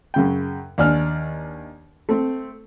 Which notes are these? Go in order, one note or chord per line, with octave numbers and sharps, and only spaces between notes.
F#2 C#3 G5
D#2 D4 D5 G#5 F6
A3 C4